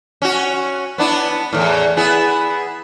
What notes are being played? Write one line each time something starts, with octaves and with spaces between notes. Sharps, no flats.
C#4 F#4
B3 D4 E4
E2 A2
B3 E4 G#4